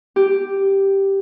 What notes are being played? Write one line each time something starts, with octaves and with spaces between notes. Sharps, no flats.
G4